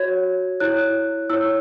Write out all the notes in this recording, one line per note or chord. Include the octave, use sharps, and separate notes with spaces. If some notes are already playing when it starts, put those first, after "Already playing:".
Already playing: F#4 C#5 G#6
E4 C#5 F#6
E4 C#5 E6